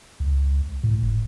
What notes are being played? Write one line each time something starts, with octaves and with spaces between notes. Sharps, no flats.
C#2
A2
G1